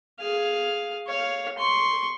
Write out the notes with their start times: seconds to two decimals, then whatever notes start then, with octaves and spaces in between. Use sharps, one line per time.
0.19 G#4 F5
1.07 C#5 F5
1.58 C6 C#6